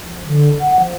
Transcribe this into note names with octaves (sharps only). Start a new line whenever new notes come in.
F3
D3
F#5
F3